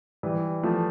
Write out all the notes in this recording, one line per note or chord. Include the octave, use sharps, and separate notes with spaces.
E3 G3
F3 A3